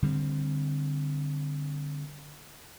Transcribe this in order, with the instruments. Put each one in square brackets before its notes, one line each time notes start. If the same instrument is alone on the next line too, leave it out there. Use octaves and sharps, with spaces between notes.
[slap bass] D3 G3 G#3 C4